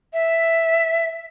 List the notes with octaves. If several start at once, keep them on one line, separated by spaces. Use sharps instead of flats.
E5